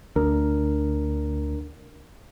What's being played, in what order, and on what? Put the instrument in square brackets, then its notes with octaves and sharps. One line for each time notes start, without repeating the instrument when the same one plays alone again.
[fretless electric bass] D2 [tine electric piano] D4 A#4